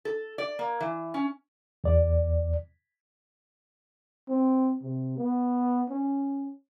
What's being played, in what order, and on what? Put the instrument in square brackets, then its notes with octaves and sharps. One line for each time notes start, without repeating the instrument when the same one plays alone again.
[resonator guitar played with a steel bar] A4
D5
A#3
E3
C#4
[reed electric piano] E2 D5
[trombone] C4
C3
B3
C#4